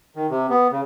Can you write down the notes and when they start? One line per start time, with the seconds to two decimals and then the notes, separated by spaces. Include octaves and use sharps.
0.16 D#3
0.30 C3
0.50 B3
0.72 C#3